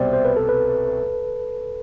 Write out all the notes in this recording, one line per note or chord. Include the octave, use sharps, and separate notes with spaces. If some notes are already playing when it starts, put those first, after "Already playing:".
Already playing: C2 B2 G3 C4 C5 D5 E5 G5
C5
B4
A4
B4